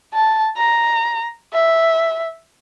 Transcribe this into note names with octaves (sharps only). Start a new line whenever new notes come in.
A5
A#5
E5